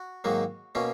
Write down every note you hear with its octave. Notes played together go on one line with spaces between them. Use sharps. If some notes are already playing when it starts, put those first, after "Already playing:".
Already playing: F#4
G#2 D#3 F#3 A#3
B2 A#3 C#4